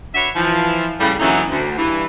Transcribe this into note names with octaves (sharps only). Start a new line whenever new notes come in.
D4 F#4 B4 C#5 E5
E3 F3
A2 C#3 G3
A#2 D3 E3 F#3 C#4 D#4
D2
G2 E3